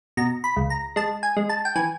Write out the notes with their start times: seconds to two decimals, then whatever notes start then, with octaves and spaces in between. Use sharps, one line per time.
0.17 B2 A#5
0.44 B5
0.56 C#2
0.70 A#5
0.96 G#3 A5
1.23 G#5
1.37 G#3
1.49 A5
1.65 G5
1.75 E3 G#5